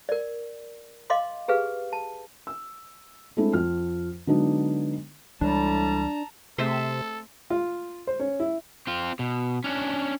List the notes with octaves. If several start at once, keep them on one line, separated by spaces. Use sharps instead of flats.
A#4 D5
D#5 F5 C6 D6
G4 G#4 B4 F5
A5
E6
G#3 A3 C4 D4 E4 A4
F2 F6
D3 F#3 G#3 B3 D4 D#4
C#2 A2 E3 G3 G#3 D4 A5 A#5
C3 A3 C4 G#4 A4 C5 E5
F4
C5
C#4
E4
C4 F4
B2
C#4 D4